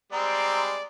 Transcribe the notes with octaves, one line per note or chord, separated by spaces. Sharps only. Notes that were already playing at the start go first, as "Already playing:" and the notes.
G3 G#3 C4 D5 A#5